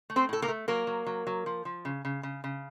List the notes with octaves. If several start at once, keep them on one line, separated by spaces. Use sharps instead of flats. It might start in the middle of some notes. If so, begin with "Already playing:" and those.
A3
C4 C5
A2 A4
A#3 A#4
A3
F#3 A#3 A#4
F#3
F#3
F#3
F3
F3
C#3
C#3
C#3
C#3